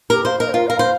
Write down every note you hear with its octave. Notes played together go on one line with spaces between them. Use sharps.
G4 A#4
C5 F5
A#4 D#5
C5
F4 A#4
A#4 F5
C5